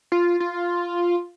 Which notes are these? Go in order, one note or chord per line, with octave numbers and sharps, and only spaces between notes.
F4
F4